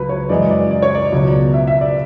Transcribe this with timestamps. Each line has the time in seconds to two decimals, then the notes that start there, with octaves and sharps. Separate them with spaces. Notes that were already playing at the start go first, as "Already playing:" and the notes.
Already playing: C#2 F#3 B4
0.09 C#5
0.29 F#2 E3 G#3 D5
0.51 D5
0.71 D5
0.82 C#5
0.95 D5
1.12 C#2 B2 F#3
1.54 E5
1.67 E5
1.81 D5